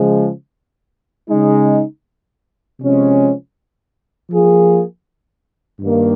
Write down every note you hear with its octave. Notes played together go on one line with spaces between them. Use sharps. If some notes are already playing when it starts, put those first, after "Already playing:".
Already playing: C#3 F3 G#3
C#3 G#3 D#4
C3 F3 G#3 C#4
F3 A#3 F4 G#4
G2 D#3 A#3